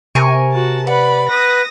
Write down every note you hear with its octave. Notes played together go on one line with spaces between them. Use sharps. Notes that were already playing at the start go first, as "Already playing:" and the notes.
C3 A#4 G#5 C#6
F#4 A5
B4 D5 F#5 B5
B4 D#6 A#6